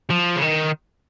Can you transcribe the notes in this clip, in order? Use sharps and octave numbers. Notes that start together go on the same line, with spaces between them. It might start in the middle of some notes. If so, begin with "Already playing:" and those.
F3
C#3
D#3